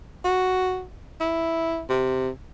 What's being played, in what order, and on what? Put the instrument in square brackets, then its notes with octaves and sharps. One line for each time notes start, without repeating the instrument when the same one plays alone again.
[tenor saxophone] F#4
E4
C3